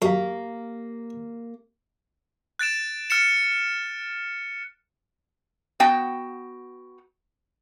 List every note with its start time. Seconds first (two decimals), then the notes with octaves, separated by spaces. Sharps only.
0.02 F#2 A#3 G4 F5
2.59 F#6 A6 D7 E7
3.10 F6 A6 C#7 E7
5.80 B3 F#4 G5 A5